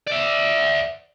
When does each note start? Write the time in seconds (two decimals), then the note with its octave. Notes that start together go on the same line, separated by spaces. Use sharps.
0.08 D5 E5